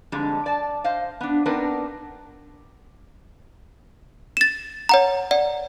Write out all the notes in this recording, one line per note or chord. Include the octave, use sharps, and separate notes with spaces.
F2 G#2 D3 G3 G#3
D5 A5
C5 D#5 F5
B3 D4
B3 C4 D4 D#4 A#4 B4
A6 E7
C#5 F#5 A#5
D5 F#5